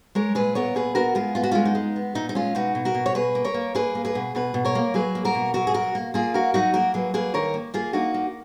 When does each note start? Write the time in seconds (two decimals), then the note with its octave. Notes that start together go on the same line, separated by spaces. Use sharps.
0.15 G#3 A#4 C#5
0.35 A#2 G#4 B4
0.55 B3 A#4 C#5
0.75 A#2 G#4 B4
0.95 B3 F#4 A#4
1.15 G#3 F4 G#4
1.35 B3 F4
1.43 F#4
1.51 G#3 C#4 F4
1.65 D#4
1.75 G#3
1.96 B3
2.15 A#2 D#4
2.29 D#4
2.35 G#3 C#4 F4
2.55 B2 D#4 F#4
2.75 B2
2.85 F#4 A#4
2.95 B2
3.06 C#5
3.15 B2 G#4 B4
3.35 A#3
3.44 A#4 C#5
3.54 A#3
3.75 A#3 G#4 B4
3.95 A#3
4.05 G#4 B4
4.15 B2
4.35 B2 G#4 B4
4.54 B2
4.65 A#4 C#5
4.75 A#3
4.94 F#3 G#4 B4
5.15 A#3
5.25 F#4 A#4
5.35 B2
5.54 F#3 F#4 A#4
5.67 G#4
5.74 B2 F#4 A#4
5.95 A#3
6.14 A#3 F4 G#4
6.34 F#3 F#4 A#4
6.54 F#3 D#4 F#4
6.74 A#3 F#4 A#4
6.94 F#3 G#4 B4
7.14 A#3 G#4 B4
7.34 D#3 A#4 C#5
7.54 A#3
7.74 A#3 F4 G#4
7.93 A#3 D#4 F#4
8.14 A#3